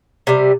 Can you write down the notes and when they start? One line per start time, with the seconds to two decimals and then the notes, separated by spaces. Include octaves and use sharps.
0.27 C3 G3